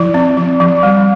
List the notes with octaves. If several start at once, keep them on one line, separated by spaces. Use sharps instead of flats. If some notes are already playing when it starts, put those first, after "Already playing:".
Already playing: F3 E4
C4
F3
F3
G3